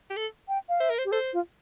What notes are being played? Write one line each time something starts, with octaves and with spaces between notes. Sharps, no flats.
G4
A4
G5
F5
C5 E5
A#4
C5
G4
A4 C5
F4